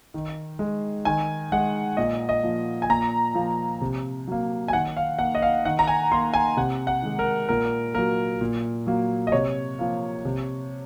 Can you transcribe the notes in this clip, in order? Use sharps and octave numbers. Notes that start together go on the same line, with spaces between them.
D#3
G#3
D#3 G#5
G#3 F#5
A#2 D#5
D#5
F3 A#3
G#5
A#2 A#5
F3 A#3
C3
F#3 A#3
G#5
D#3 F#5
F5
A#3 F#5
D#5
F5
D#3 F#5
A#5
G#5
A#3 C6
G#5
C3 F#5
F#5
D#3 G#3
A#4
A#2 A#4
F#3 A#3 A#4
A#2
F#3 A#3
D#5
C3 C#5
F3 A#3
C3